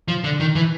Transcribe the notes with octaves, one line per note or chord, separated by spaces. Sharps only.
F3
D3
D#3
E3